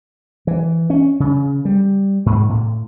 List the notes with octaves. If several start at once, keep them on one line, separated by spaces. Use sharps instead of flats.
E3
C#4
C#3
G3
G#2
A2